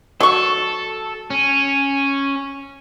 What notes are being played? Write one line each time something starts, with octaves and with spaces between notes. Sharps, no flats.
F#3 A4 C#6
C#4